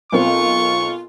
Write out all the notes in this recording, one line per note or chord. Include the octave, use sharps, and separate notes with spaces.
B1 C4 F4 A#4 C#6